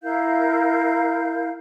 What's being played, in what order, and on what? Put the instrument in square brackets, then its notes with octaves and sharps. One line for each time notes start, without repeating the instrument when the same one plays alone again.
[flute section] E4 A#4 F5 G6